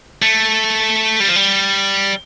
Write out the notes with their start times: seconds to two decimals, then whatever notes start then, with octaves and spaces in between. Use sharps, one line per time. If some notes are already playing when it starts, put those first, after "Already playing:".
0.22 A3
1.20 G3
1.28 F3
1.36 G3